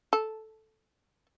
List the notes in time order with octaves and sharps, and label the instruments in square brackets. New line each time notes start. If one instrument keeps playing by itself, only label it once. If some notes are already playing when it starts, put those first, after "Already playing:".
[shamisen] A4